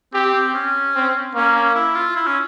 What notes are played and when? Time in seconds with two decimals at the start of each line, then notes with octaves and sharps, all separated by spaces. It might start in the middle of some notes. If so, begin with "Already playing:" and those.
0.13 C4 G4
0.34 C4
0.54 C#4
0.95 C4
1.35 A#3 C#4
1.55 C#4
1.75 E4
1.95 F4
2.16 E4
2.27 C#4